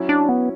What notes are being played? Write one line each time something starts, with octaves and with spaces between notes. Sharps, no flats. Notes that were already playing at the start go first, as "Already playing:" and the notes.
Already playing: F#3 C#4 E4
D4
B3